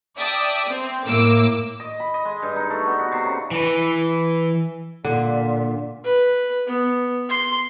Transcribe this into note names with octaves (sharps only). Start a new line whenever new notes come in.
D5 E5 G5 A5 D#6
C4
A2 A#3 D6 E6
D#5
B5
D#5
G#3
G2
D#4
A3
B3
F#4
C3
C#3
E3 B4
A#2 D3
B4
B3
C6